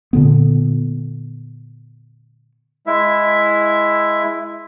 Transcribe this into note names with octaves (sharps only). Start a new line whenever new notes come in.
A#2 D3 B3
G#3 E4 E5